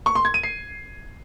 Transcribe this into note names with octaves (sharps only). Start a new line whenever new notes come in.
C#6
C6
G#6
D#7
C7